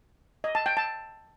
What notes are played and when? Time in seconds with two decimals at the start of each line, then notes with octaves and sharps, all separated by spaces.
0.44 D#5
0.55 A5
0.66 G5
0.77 A5